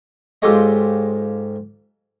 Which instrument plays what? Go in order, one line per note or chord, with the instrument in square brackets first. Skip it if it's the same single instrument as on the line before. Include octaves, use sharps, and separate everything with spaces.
[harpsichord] G#2 F4 G4 A4 C#5 D#5